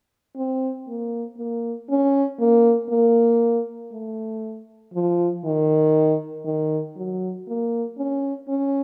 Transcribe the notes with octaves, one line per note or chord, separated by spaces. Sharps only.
C4
A#3
A#3
C#4
A#3
A#3
A3
F3
D#3
D#3
F#3
A#3
C#4
C#4